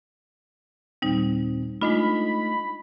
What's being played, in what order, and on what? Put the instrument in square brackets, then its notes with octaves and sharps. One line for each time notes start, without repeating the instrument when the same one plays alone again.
[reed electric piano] D#2 A#2 C4 [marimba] G3 D#4
[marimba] G#3 D4 F4 [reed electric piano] A3 D#4 D#5 [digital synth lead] B5